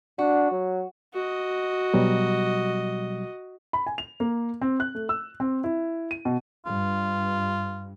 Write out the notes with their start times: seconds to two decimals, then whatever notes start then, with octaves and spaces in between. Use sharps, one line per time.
0.19 D4 F#4
0.51 F#3
1.14 F#4 D#5
1.94 B2 F#3 G3
3.73 B5
3.86 G#5
3.98 F7
4.20 A#3
4.61 C4
4.80 F#6
4.95 A3
5.09 E6
5.40 C4
5.64 E4
6.11 D#7
6.25 B2
6.66 G2 F4